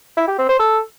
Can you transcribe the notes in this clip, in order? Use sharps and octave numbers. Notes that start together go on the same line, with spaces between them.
E4
G4
C4
C5
A4